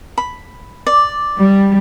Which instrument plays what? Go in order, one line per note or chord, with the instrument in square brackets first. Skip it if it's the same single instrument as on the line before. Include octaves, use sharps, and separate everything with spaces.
[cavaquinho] B5
D5
[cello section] G3